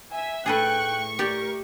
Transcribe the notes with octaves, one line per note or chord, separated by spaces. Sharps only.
E5 G#5
A2 G#4 A4 B4 G5 C#6 F#6
G4 A#4 D5